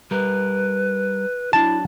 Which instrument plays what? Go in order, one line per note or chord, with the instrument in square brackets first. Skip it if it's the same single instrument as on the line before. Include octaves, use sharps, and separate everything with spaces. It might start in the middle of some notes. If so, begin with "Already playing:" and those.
[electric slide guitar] G3 A#4 [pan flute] B4
[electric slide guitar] F#3 D4 [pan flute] E4 [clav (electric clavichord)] A5